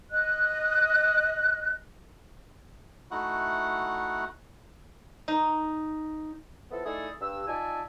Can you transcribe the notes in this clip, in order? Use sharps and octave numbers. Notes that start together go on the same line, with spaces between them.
D#5 F#6
A3 D#4 E4 F#4 F#5
D#4
F3 B3 E4 A4
A3 D#4 E4 G#4 A4 D5
G2 E6
D#4 F4 D5 E5 G#5 A5